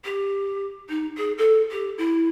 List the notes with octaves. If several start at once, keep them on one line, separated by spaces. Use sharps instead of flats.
G4
D#4
G#4
A4
G4
E4